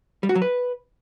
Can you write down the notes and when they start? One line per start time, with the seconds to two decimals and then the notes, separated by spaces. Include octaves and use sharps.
0.23 G3
0.29 F#4
0.35 F#3
0.42 B4